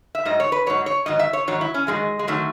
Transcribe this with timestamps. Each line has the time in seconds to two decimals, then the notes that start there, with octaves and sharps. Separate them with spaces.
0.15 E5
0.25 G#2 F#3 D#5
0.40 C#5
0.52 B4
0.66 G#2 F#3 C#5
0.86 C#5
1.06 G#2 D#3 F#3 D#5
1.19 E5
1.33 C#5
1.47 G#2 D#3 F#3 C#5
1.61 E4
1.74 C#4
1.87 G#2 D#3 F#3 G#3
2.19 G#3
2.27 D#3 F#3 A3